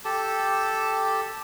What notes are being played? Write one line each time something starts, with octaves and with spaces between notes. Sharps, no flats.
G4 A4 A5